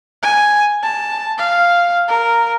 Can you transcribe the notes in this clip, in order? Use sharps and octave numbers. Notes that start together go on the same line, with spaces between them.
G#5
A5
F5
A#4